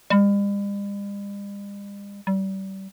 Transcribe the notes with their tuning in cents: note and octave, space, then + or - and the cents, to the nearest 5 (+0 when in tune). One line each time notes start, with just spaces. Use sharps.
G3 +45
G3 -30